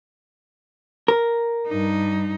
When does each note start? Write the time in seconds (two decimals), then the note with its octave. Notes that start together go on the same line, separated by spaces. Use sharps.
1.08 A#4
1.68 G2 D#4